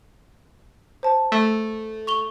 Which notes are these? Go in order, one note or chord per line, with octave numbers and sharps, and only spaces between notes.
C5 A5
A3
C#6 F7 G7